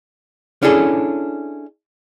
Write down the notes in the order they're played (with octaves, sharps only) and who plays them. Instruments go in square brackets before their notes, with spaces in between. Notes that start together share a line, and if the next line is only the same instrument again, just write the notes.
[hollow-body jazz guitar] C#4 D4 E4 G#4 A4